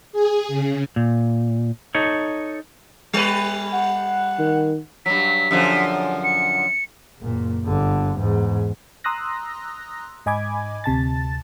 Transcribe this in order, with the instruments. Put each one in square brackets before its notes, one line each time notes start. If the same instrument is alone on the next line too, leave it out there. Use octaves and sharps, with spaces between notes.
[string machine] G#4
C#3
[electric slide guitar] A#2
D#4 A4 C#5
[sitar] G3 B4
[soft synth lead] F#5
[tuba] D#3
[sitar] G2 F#3 [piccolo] B6
[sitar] F#2 D3 F3
[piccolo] C#7
[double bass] F#1 A#2
G1 D3
E2 G#2
[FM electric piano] A#5 C6 D#6 E6 F#6 A#6
G#2 D#5 G#5 B5 D6 G#6
D2 C3 A5 A6